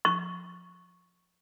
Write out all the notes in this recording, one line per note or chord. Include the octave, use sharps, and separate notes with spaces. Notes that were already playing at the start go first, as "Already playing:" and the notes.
C#6